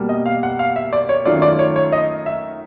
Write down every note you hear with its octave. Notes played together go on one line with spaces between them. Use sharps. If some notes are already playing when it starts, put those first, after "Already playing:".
Already playing: B2 G3 A#3
D#5
F5
F#5
F5
E5
D5
C#5
D#3 F#3 A3 C#4 F4 D5
D5
C#5
C#5
D#5
E5